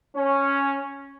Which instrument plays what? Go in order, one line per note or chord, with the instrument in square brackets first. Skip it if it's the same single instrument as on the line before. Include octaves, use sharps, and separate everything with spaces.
[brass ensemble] C#4